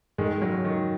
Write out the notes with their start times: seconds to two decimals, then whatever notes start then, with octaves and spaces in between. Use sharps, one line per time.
0.18 G#2 D#3 G#3
0.42 C#3 F#3
0.64 D#3